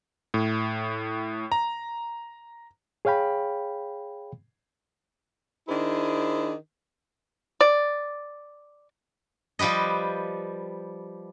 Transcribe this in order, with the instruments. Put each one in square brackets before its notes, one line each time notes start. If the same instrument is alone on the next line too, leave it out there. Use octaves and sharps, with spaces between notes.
[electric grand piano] A2
A#5
[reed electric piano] G#4 C#5 F5 G5 B5
[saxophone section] D#3 D4 E4 G#4 C5
[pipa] D5
[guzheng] F3 G3 G4 B4 D#5